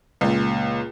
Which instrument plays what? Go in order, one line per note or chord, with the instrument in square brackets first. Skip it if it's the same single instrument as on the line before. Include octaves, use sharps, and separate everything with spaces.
[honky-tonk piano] C#2 A#2